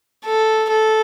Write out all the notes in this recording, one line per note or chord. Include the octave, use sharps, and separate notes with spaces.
A4
A4